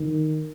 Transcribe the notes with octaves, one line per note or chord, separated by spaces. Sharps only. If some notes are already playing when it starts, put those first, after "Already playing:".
Already playing: D#3